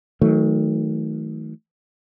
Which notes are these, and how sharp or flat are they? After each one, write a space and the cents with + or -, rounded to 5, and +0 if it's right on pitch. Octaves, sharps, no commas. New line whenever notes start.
D#3 +35 F#3 -5 A3 +0